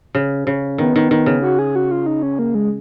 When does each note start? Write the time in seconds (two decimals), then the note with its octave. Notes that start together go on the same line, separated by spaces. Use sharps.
0.15 C#3
0.47 C#3
0.78 D#3 B3
0.96 D#3
1.11 D#3
1.26 C#3
1.42 F#4
1.59 G#4
1.76 F#4
1.91 F4
2.06 D#4
2.23 C#4
2.39 A#3
2.55 G#3